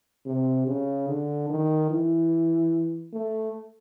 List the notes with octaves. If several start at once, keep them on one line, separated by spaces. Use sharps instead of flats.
C3
C#3
D3
D#3
E3
A3